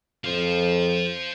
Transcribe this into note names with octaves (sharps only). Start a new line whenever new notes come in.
F2 C5 F5